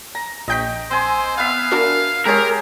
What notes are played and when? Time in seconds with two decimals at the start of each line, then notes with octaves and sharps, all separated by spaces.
0.15 A#5
0.48 A#1 D#5 G5 C#6 G6 B6
0.91 C4 C5 G#5
1.38 B3 E5 F5
1.71 D4 F#4 A#4
2.26 G#3 G4 G#4 A#4 C#5 C6